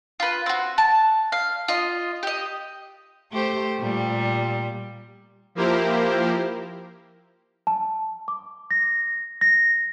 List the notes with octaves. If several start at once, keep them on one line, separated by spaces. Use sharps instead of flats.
F4 B4
C4 F#4
A5
F5
F4 D#5
G4 D#5
A3 G4 C5
A#2 G3
F3 A#3 E4 G4 A#4 C5
A5
D6
A#6
A#6